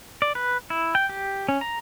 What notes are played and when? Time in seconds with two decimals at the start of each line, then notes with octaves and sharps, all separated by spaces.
0.22 D5
0.35 B4
0.70 E4
0.95 G5
1.09 G4
1.49 C#4
1.61 A#5